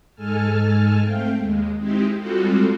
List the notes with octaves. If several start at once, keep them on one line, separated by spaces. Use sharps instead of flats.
G#2 G#3 A4 G#5 A5 F6
A3 C4 F5 G5
D#2 G#3
G#3 C4 D#4 E4 G4
G3 G#3 C4 F4 F#4 A4